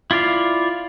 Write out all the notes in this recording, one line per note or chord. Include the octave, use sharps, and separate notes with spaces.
E4 F4 D5 F5